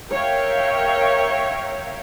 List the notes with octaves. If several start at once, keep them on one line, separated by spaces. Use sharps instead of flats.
A#4 C#5 E5 F5 G5